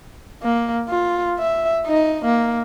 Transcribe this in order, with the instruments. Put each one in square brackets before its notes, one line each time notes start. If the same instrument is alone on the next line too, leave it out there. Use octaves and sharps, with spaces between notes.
[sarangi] A#3
F4
E5
D#4
A#3